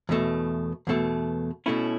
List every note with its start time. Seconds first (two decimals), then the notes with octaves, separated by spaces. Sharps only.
0.09 E2 B2 A3
0.87 E2 B2 A3
1.66 B2 A3 C#4 E4